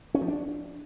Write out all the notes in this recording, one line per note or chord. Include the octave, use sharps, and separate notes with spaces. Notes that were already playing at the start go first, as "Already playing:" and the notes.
C#4
F3
D4